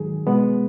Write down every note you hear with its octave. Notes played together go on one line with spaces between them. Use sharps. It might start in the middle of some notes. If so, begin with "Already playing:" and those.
Already playing: G#2 D#3 F#3 G#4
B2 G#3 B3